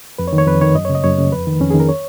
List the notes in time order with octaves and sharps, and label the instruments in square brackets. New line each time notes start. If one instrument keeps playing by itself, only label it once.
[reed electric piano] F2 B4
C#5
D#3
C#5
F2 B4
D#3 C#5
F#2 D#5
C#5
C#3
D#5
F#2 C#5
C#3
F2 B4
D#3
F2 C#4
G#4
D#3
A#4
C#5